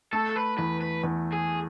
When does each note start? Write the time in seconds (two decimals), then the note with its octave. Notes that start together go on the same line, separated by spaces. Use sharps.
0.13 A3 A4
0.36 B4
0.58 E2 B4
0.81 B4
1.04 E2
1.33 G#4